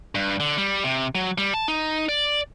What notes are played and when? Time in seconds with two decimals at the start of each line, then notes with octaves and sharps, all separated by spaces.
0.15 G2
0.40 D3
0.58 G3
0.84 C3
1.15 F#3
1.38 G3
1.54 A5
1.68 D#4
2.09 D5